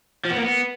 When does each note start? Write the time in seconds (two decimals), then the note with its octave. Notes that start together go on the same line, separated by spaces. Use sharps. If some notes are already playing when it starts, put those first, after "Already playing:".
0.25 F3
0.31 B3
0.36 A#3
0.42 B3